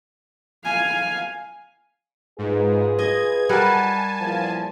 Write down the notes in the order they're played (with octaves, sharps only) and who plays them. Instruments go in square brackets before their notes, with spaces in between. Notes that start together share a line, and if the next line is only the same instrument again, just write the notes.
[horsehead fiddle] F5 G#5
[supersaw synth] G#2 [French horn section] F4 G#4 B4
[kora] D#5 [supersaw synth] G#6
[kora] G3 A#4 F#5 [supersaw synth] G#5 A5
[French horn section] E2 A#2 F3